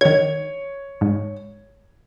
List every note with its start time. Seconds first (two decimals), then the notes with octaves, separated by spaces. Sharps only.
0.01 D#3 C#5 G#6
1.01 G#2